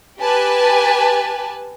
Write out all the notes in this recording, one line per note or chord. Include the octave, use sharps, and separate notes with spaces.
G4 B4 G#5 A5